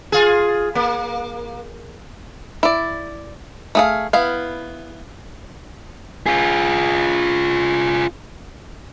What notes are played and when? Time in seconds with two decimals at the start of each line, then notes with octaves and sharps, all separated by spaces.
0.12 F4 G#4
0.75 A#3
2.63 E4 D5
3.75 A3 G#4 F5
4.13 B3 E4 F5
6.26 F4 G#4